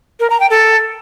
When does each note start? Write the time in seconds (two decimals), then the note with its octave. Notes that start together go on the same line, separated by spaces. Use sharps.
0.20 A#4
0.30 A#5
0.40 G5
0.50 A4